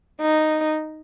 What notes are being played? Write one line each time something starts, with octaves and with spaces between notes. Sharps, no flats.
D#4